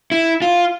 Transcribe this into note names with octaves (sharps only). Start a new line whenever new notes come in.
E4
F4